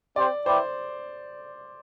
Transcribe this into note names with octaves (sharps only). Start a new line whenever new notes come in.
C4 G4 C5 D5
E4 B4 C5 D5 G5